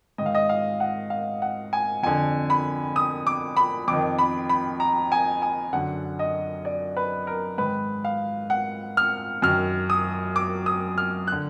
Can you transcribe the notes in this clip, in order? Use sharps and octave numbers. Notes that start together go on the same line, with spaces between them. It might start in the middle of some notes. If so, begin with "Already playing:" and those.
G#2 D#3 D#5
F5
D#5
F5
F#5
F5
F#5
G#5
F2 D3 G#5
B5
D#6
D6
B5
F2 D6
D#3
B5
B5
A#5
G#5
G#5
F#2 D3 F#5
D#5
D5
B4
A#4
G#2 D#3 B4
F5
F#5
F6
F#2 D#3 F6
D#6
D6
D#6
F6
F#6
D3